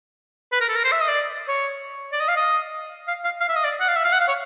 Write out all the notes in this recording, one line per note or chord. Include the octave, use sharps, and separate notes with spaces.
B4
A#4
A4
A#4
C5
E5
D#5
D5
C#5
D5
D#5
F5
D#5
F5
F5
F5
E5
D#5
D5
F#5
F5
E5
F5
F#5
F5
C#5